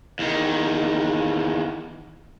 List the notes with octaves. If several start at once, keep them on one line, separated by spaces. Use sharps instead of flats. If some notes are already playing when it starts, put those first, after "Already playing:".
E2 D#3